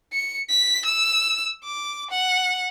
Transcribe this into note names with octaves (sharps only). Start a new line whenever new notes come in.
C#7
B6
E6
D6
F#5